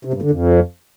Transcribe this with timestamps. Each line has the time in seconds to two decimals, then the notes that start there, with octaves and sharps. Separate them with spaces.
0.05 C3
0.14 G2
0.22 D3
0.31 F2